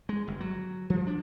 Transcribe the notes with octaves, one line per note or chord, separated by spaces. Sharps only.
G#3
G1
F#3
F3
D4